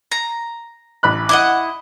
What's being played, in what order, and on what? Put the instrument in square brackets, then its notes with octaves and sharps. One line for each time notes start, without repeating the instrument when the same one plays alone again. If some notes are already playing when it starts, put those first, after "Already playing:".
[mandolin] A#5
[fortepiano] A1 B5 F#6
[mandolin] E4 D#5 F#5 [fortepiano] D6